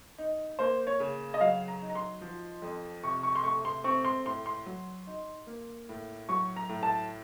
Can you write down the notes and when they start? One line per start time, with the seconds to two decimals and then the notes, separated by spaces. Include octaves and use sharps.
0.18 D#4
0.59 A#3 C5
0.87 C#5
1.00 C#3
1.34 D#5
1.41 F#3 F5
1.68 A#5
1.82 D#4
1.90 A#5
1.95 C6
2.21 F3
2.62 F2
3.04 C3 C#6
3.23 C#6
3.35 C6
3.44 A3 C#6
3.65 C6
3.84 C4 C#6
4.05 C6
4.26 A2 C6
4.46 C6
4.66 F#3
5.07 D#4
5.47 A#3
5.89 A2
6.29 F#3 C#6
6.56 A#5
6.69 A2
6.83 A5